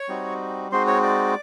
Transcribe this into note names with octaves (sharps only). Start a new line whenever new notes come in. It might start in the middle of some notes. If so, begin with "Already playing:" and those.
Already playing: C#5 C#6
G3 C4 D#4 F#4
G#3 C4 D#4 F#4 C5 C6
C#5 C#6
D5 D6